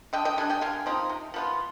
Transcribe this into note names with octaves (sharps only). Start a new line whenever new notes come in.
D3 D#5 G5
D#5 G5
G3 D4 G#5
D#5 G5
D3 F5 G#5
F3 C4 D#4
C3
F3 B3 F4